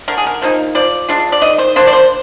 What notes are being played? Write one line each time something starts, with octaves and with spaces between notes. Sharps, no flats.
D3 A#4
G#4
A#4
F3 A#3 D#4
F3 D5
G#3 D4 F4
D5
D#3 D#5
C5
A#3 D4 C5
D5
C5